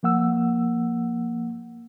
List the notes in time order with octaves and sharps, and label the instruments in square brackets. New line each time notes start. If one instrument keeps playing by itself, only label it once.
[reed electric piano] F3 A#3 F#5 E6